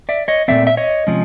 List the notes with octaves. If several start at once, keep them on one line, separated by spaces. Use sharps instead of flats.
D5 E5
C#5 D#5
A#2 F3 A3 C4 D5 E5
E5
C#5 D#5
C3 F3 G#3 C#4